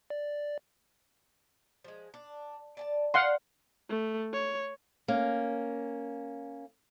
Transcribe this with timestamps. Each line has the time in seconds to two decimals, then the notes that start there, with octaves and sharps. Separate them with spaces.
0.10 D5
1.84 F3 G#3
2.14 D4
2.77 D5 G#5 A5
3.14 D5 F5 F#5 C6
3.90 A3
4.33 C#5
5.08 A#3 C#4